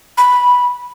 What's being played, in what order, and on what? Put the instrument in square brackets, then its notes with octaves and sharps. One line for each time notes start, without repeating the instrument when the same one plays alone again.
[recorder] B5